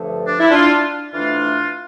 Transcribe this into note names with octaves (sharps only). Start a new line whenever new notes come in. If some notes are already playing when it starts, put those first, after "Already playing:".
Already playing: G2 D3 F3 A3
D4
E4
D4 F4
F2 E3 A3 D4 F4